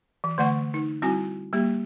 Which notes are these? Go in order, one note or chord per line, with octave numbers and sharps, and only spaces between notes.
E3
D3 A3 D5 F#5 C#6
D#4
G3 C4 E4 F#4 G#5
G3 A#3 G4